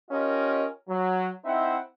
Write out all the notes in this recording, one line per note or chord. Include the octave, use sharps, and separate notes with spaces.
C#4 F4 G4 A#4 D#5
F#3
C4 D#4 E4 C5 E5 F#5